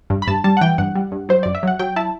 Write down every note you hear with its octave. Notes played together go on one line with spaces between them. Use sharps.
G2
B5
G2 A5
G3 A5
F#5
E3 G5
G2 F#5
G3
G2
F#3 C5
F#2 D5
E5
F#3 F#5
F#3 G5
E4 A5